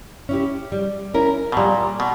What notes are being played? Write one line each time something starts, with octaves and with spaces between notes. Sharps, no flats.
C#4 E4 G4
G3
C#4 E4 A#4
B2
A#2 G3
B2